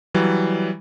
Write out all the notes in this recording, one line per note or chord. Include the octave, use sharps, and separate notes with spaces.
E3 F#3 G3